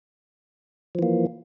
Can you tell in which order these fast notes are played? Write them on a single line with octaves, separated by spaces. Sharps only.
F3 E3 A#3